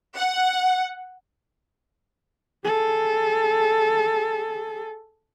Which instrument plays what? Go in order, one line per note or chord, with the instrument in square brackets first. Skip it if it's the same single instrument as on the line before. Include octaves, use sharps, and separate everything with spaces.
[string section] F#5
[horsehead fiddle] G#4 A4